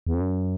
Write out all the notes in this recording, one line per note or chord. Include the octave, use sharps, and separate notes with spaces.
E2
F2
F#2